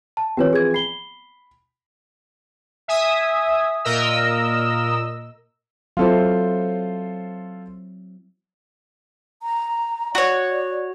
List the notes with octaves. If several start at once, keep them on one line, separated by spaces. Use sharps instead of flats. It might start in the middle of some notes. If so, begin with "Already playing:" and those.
A5
E3 F3 C4 G4 B4 C#5
G#4 G#6
B5 C7 G7
E5 G#5 D#6
A#2 A#4 D#5 E6
F#3 C4 E4 F4 A4 C5
A#5
F#4 C#5 D5